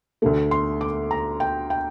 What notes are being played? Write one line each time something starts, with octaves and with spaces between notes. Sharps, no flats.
D2 D3 A3
C6
D6
A#5
G5
G5